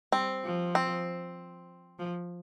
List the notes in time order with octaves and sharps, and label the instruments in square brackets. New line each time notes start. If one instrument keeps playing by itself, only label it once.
[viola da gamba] G3 [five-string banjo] C4
[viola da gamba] F3
[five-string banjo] C4
[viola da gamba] F3